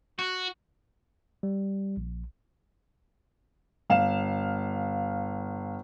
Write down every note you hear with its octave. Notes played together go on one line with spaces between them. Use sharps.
F#4
G3
A#1
G1 F5 E7